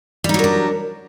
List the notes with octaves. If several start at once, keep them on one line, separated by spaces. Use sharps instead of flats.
F#3 G3 D4 D#4 A#4